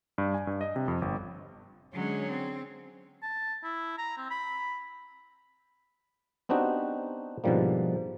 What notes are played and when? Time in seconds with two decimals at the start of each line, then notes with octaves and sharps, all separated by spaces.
0.18 G2
0.34 G#5
0.47 G2
0.61 D#5
0.76 C3
0.88 F2
1.02 G1
1.93 D3 F#3 G#3 C#4 G#4
2.30 C4
3.22 A5
3.64 E4
3.98 A#5
4.17 C4
4.30 B5
6.49 B3 C4 D4 D#4 F#4 G4
7.44 G#2 B2 D3 F3 G3 A#3